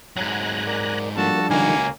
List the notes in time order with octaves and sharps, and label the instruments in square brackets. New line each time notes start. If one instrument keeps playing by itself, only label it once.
[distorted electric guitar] G#2 F#3 [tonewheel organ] G#5 A#5 F#6
[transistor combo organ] A#4 D5
[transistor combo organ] F3 G3 D4 [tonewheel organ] A#3 [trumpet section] F#4 A4 A5
[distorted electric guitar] C#2 F#4 [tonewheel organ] D3 D#3 [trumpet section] A#3 G#5